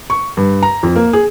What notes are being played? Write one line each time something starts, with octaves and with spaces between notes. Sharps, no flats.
C#6
G2
A#5
F2
A#3
G#4